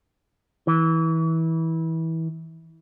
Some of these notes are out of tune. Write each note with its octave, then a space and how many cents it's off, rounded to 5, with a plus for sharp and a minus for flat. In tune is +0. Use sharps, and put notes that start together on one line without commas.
E3 -25